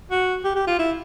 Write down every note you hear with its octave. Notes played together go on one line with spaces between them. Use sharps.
F#4
G4
G4
F4
E4